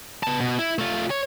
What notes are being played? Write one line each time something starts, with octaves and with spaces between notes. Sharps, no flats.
B3 A5
B2
E4
A3 F4
C#5